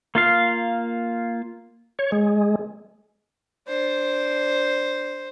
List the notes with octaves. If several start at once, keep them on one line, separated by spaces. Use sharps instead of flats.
A#3 F4 F5
C#5
G#3
D4 C5